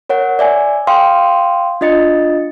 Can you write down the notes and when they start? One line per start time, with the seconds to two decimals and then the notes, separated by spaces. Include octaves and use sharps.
0.10 A#4 C#5 F#5
0.39 D5 E5 G#5
0.87 F5 G5 C6 D#6
1.81 D4 F4 D#5 A6 C#7